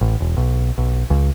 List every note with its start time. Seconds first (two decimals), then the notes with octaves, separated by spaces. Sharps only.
0.01 A1
0.20 E1
0.37 B1
0.78 B1
1.10 C#2